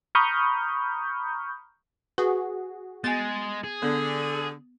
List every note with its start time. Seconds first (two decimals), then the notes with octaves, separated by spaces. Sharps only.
0.15 A#5 B5 C#6 D#6 F6 G6
2.18 F#4 G#4 B4
3.04 G#3 B3 G#5 A6
3.64 G#4
3.83 D3 B3